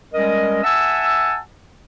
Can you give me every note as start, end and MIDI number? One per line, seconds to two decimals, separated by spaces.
0.13 0.61 55
0.13 0.61 56
0.13 0.61 61
0.13 0.61 70
0.13 0.61 75
0.64 1.37 76
0.64 1.37 78
0.64 1.37 80
0.64 1.37 81
0.64 1.37 88